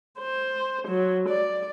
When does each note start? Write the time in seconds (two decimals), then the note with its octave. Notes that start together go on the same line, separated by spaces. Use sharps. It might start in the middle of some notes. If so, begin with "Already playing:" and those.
0.19 C5
0.88 F#3
1.29 D5